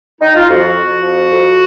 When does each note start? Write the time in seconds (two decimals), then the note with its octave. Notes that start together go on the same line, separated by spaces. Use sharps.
0.21 D#4
0.35 F4
0.48 F2 F#4
0.76 F2
1.03 F3
1.31 F2